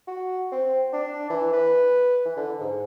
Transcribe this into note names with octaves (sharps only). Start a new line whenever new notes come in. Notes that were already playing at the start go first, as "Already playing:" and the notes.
F#4
C4
D4
E3
B4
E3
D3
G#2